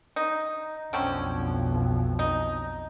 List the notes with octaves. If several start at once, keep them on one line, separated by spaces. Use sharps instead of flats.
D#4
B1 F2 D3 C4 C#4
D#4